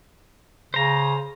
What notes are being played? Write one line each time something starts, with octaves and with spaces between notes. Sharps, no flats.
C#3 C5 A#5